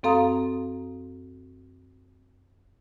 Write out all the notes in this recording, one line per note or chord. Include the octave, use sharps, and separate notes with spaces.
F#2 C4 A4 F5 A#5 D#6